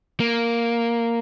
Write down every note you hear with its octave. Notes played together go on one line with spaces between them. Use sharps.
A#3